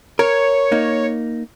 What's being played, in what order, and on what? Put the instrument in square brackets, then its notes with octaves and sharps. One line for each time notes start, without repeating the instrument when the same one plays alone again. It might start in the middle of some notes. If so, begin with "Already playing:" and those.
[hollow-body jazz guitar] A#4 [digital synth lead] C#5
[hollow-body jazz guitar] A#3 D#4